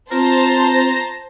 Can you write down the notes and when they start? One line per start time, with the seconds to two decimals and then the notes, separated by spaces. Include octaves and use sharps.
0.11 C4 F4 C5 A5 A#5